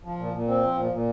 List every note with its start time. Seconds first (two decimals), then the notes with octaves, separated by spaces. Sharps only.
0.04 F3
0.19 A#2
0.33 A#2
0.48 C4
0.62 F3
0.77 A#2
0.92 A#2